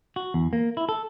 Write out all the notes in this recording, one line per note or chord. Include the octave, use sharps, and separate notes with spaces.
F#4
E2
A#3
E4
A4